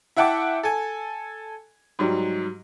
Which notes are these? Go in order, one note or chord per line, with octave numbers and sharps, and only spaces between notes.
E4 E5 F#5 G5 A5 D6
A4 G#5
G#2 F#3 G3